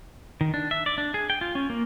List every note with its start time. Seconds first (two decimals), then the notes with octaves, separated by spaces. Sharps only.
0.41 D#3
0.54 D4
0.71 E5
0.86 D5
0.98 D4
1.14 G#4
1.30 G5
1.41 F4
1.55 C#4
1.70 A#3